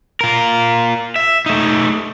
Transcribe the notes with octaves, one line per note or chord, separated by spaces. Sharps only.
F4 A#4
E5
A3 D#4